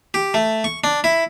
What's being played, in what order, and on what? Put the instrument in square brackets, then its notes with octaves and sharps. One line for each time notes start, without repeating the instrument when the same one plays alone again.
[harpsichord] G4
A3
C#6
D4
E4